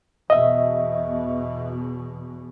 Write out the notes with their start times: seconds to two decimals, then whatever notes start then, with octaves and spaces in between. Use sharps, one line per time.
0.30 E2 B2 D#5 E5